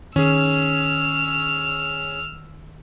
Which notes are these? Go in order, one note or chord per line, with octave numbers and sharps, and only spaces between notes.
D#3 C#4 G#4 E6 F6